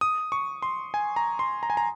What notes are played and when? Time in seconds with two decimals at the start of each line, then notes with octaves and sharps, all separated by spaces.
0.01 D#6
0.32 C#6
0.62 C6
0.94 G#5
1.16 A#5
1.39 C6
1.63 A#5
1.70 G#5
1.77 A#5